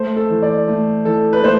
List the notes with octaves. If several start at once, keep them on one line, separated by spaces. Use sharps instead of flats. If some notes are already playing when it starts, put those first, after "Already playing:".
Already playing: A3 C5
A4
E3
D5
A3
E3 A4
B4
A3 C5